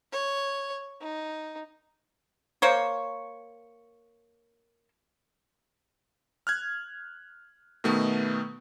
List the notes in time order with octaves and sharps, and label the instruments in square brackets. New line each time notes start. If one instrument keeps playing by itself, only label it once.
[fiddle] C#5
D#4
[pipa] A#3 C5 C#5
[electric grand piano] F6 F#6 G#6
B2 D#3 A3 B3